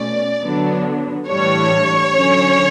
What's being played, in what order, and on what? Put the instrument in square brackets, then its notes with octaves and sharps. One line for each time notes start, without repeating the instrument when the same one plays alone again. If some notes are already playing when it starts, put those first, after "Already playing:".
Already playing: [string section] B2 A3 C#4 D5
D3 F#3 B3 D4
A2 E3 G3 D4 C#5
D3 F#3 C#4